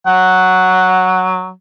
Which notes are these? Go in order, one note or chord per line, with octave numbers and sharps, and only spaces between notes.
F#3 F#5